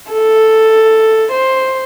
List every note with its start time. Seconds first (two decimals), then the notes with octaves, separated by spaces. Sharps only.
0.12 A4
1.32 C5